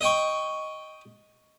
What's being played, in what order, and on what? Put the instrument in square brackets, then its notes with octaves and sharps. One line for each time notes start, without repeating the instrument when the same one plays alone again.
[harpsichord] D#5 G5 C#6